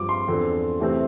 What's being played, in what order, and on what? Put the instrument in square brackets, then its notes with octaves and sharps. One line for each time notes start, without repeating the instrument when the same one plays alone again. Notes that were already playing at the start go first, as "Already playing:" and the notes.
Already playing: [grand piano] G2 F3 C4 D6
C6
E2 D3 F3 C4
C3 E3 A3 C4